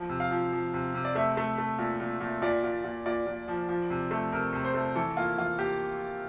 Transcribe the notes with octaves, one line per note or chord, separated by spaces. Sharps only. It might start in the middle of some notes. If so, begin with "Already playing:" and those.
Already playing: F3
C3
F5
F3
F3
C3
C3
D5
A3 E5
A3
A3
A#2
A#2
A#2
A#2 D5
A#2
A#2
A#2 D5
A#2
F3
F3
C3
A3
C3 A#4
C3
C5
A3
E3 A4
A#3 F4
E3 F4
A#3 G4